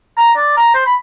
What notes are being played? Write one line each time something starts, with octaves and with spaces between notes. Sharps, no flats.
A#5
D5
A#5
C5
B5